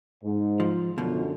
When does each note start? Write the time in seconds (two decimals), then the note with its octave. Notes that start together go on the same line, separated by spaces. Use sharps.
0.24 G#2
0.60 F3
0.98 F#2 B2 D3 F3